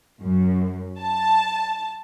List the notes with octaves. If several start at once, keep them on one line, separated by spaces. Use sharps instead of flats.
F#2
A5